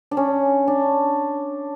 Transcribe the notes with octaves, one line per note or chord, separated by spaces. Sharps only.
D4
C#4
D4